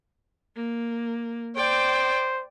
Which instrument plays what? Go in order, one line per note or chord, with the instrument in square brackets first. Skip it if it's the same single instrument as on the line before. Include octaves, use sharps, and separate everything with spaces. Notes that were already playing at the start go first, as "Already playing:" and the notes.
[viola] A#3
[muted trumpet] C5 [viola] D5 G5